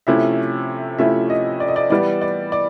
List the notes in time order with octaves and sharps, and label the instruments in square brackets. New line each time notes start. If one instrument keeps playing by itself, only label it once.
[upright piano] C3 F3 A3 C#4 E4 E5
C3 F3 A3 C#4 E4 E5
D#5
D5
D#5
D5
E3 G3 B3 D5
D5
D5